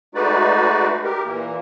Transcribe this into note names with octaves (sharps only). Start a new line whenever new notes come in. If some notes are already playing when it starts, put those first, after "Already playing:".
G#3 A3 D#4 F#4 B4 D5
G4 A#4
A#2 E3 A#3